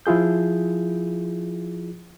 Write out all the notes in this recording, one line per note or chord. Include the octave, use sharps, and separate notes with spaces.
F3 E4 F4 G#4 G6